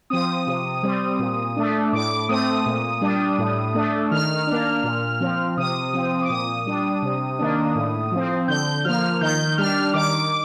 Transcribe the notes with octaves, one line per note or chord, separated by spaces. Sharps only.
F3 C4 D#6
C3
G3 C4
A#2
A3 D4
A2 D6
A3 C4 D#6
A#2
G3 D4
A2
A3 D4
D#3 F6
A#3 D4
A#2
F3 C4
C3 D#6
F3 C4
D6
A#2 D#6
G3 D4
C3
D#3 A#3 D4
A2
F3 C4
D3 G6
F3 A#3 F6
D#3 G6
G3 D4 F6
D#3 D6